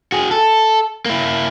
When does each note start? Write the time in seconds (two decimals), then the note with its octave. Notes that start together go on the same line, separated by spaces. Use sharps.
0.12 F#4 G#4
0.31 A4
1.06 A#3 E4